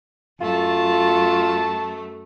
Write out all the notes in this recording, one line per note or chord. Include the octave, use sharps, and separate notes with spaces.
F#2 A3 F4 A5